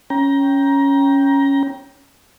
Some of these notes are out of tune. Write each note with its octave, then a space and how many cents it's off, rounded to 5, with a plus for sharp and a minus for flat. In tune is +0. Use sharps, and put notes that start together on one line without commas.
C#4 +0 G5 +0 A#5 +20